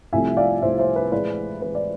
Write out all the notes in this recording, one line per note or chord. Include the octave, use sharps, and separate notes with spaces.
C2 C3 F3 A3 E5 G#5
D5 F5
C2 C3 F3 A3 C5 E5
C5 E5
B4
A2 E3 G#3 B4 D5
A2 E3 G#3 B4
D5